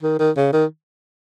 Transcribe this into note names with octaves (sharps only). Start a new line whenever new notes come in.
D#3
D#3
C#3
D#3